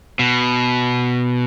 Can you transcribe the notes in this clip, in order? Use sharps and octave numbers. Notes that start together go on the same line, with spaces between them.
B2